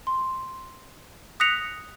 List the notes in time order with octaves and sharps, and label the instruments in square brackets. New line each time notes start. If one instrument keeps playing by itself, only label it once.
[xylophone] C6
D#6 F#6 A#6 B6 C#7 F7